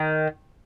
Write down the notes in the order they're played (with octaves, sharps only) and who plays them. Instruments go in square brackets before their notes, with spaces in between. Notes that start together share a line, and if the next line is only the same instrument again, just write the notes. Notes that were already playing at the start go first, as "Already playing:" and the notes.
Already playing: [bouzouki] D#3